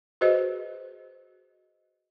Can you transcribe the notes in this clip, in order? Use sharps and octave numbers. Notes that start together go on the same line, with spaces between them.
F#4 G#4 B4 C5 D#5